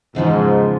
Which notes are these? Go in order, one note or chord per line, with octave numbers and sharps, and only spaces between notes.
E2 G#2 C#3 F3 G#3